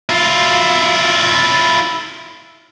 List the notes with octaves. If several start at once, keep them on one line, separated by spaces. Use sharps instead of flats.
E4 F4